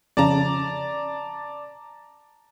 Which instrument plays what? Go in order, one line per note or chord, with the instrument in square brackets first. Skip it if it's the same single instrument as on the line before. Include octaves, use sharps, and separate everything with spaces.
[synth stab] F2 C#3 [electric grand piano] D5 A5 A#5